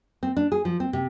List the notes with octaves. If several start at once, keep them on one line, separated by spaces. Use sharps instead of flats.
C4
D4
G#4
F3
C4
C3